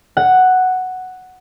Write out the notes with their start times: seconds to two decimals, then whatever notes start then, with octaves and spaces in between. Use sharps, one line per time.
0.17 F#5